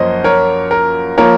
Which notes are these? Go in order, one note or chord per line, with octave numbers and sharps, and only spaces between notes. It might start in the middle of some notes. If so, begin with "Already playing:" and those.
Already playing: F#2 F3 A#3 C#4 C5 D#5
A#4 C#5
A#4
F3 A#3 A#4 C#5